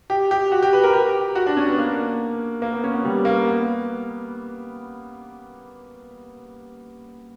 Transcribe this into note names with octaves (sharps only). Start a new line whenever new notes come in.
G4
G4
F#4
G4
B4
A#4
G4
F#4
D4
C#4
B3
A#3
A#3
B3
C#4
B3
G3
A#3
B3